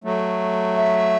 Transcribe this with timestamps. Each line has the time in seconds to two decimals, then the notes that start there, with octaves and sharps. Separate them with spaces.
0.04 F#3 A3
0.77 E5